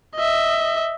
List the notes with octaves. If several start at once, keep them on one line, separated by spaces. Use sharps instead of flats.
D#5 E5